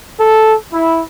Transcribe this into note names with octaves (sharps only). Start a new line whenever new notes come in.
A4
E4